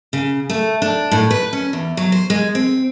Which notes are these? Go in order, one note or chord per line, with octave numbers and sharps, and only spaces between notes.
C#3
A3
D4
A2
B4
C#4
E2
F#3
C5
G#3
C4